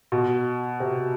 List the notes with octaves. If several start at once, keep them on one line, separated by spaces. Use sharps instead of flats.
B2
C3